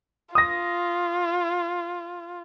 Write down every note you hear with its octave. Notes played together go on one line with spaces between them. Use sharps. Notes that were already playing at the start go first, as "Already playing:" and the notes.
F4 D#6 A#6